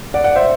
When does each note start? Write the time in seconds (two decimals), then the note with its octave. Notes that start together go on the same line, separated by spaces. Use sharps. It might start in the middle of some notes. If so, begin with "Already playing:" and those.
0.14 D5 F#5
0.24 D5 F#5
0.35 C5 E5